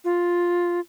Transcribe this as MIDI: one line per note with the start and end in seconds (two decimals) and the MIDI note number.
0.04 0.80 65